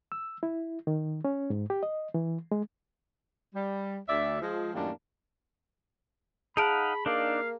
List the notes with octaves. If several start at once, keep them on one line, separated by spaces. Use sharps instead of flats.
E6
E4
D#3
C#4
G#2
G4
D#5
E3
G#3
G3
D2 D5 E5
F3 G#3
F#2 A2 D#3 G3 A#3 D4
D#4 G#4 F5 F#5 A5 B5 D7
A#3 D4 D#4 D5 F5